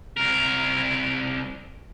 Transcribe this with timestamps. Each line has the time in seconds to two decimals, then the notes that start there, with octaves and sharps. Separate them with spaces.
0.17 C2 A#4